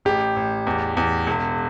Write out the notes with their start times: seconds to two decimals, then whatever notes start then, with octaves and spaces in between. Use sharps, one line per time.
0.05 A1 G4
0.36 A1
0.67 E2
0.97 E2
1.27 E1